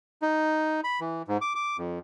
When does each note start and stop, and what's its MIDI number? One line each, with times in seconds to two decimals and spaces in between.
0.22 0.81 63
0.84 1.00 83
1.00 1.22 52
1.28 1.38 44
1.41 1.53 86
1.55 1.77 86
1.78 1.99 41